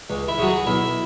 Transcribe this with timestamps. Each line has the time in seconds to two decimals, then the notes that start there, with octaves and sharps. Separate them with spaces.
0.10 C#2
0.28 E4
0.38 C#3 F#3 F#4
0.48 G#4
0.66 B1 E4